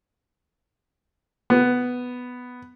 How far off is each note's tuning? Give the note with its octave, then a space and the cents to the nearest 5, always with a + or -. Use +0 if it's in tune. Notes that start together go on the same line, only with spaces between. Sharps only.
B3 +5